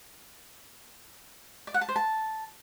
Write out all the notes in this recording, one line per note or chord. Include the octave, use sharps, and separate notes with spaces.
D5
F#5
A5
C5
A5